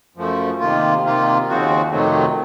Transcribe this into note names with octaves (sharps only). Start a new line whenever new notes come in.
F#2 F3 A3
C3 D#3 A#3 F4
C3 D#3 A#3 F4
D#2 C#3 F3 C4 F#4
F2 C3 D#3 F#3 A3